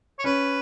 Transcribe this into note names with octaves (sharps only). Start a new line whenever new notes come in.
C#5
C#4 B4